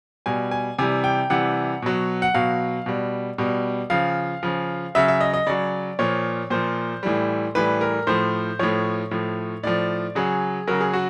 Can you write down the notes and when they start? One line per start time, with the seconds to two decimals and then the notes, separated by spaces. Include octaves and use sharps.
0.26 B2 G3 G#5
0.51 G#5
0.78 C3 E3 G3 G#5
1.04 G5
1.30 C3 E3 G3 F#5
1.82 B2 F#3
2.22 F#5
2.34 B2 F#3 F5
2.86 B2 G3
3.38 B2 G3
3.90 C#3 F3 F5
4.43 C#3 F3
4.95 C#3 F#3 E5
5.08 E5
5.21 D#5
5.34 D#5
5.46 C#3 F#3 D5
5.99 A#2 F3 C#5
6.50 A#2 F3 C5
7.03 A2 E3 G3
7.55 A2 E3 G3 B4
7.81 A#4
8.07 A2 F3 C5
8.59 A2 F3 C#5
9.11 A2 F3
9.63 A2 F3 D5
10.15 C#3 F#3 G#4
10.67 C#3 F#3 A#4
10.81 G#4
10.93 F#4